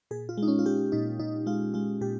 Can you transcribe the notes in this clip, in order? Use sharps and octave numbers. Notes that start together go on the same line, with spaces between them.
A#2 G#4
F4
G#3 D#4
C#4
F4
G#3 G4
A#2 D#4
A#2 D#4
G#3 F4
G#3 F4
A#2 G4